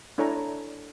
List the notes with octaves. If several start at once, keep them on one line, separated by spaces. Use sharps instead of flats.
D4 E4 A4 C#5 G#5 A#5